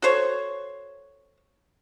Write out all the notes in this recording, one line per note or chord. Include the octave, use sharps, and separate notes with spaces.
F#4 A4 C5 C#5